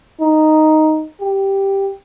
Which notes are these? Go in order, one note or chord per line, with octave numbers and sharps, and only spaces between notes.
D#4
G4